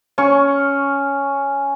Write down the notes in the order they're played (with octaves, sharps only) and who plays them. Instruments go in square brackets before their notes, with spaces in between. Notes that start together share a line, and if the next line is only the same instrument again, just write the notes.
[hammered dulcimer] C#4 C#6